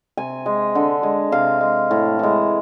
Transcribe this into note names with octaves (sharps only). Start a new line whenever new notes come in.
C3 G#5
G#3
D3
G#3
C3 F5
G#3
A2
E3 G#3